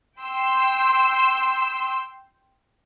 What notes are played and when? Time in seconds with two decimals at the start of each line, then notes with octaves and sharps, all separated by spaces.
0.20 G5 C6 E6